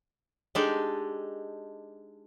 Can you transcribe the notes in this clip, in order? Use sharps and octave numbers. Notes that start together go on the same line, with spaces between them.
G#3 D4 D#4 G4 A4